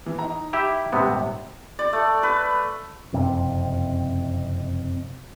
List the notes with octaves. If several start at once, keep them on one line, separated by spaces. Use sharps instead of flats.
E3
D#4 A#5
E4 G4 E5
D#1 G#1 C3 B3
D5
A3
B4
F#1 F2 C3